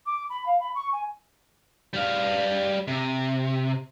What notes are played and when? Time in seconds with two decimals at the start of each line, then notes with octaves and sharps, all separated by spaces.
0.06 D6
0.30 B5
0.46 F5
0.60 B5
0.75 C#6
0.92 G#5
1.93 G3 F5
2.88 C3